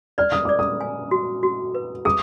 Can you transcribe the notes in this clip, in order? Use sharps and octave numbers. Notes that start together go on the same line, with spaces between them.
D5 F6
D#6
D5 D6
D#6
G#5
F#4
F#4
B4
G#4 D#6